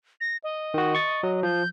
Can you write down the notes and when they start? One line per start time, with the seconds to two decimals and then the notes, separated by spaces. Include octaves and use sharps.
0.21 A#6
0.44 D#5
0.74 D#3 F#4
0.95 C#6 A6
1.23 F#3
1.43 F3 G6